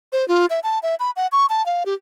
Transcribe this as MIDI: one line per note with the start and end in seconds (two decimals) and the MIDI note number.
0.13 0.27 72
0.28 0.46 65
0.50 0.60 76
0.64 0.79 81
0.83 0.95 76
1.00 1.11 83
1.16 1.27 78
1.32 1.46 85
1.50 1.65 81
1.66 1.83 77
1.86 1.94 67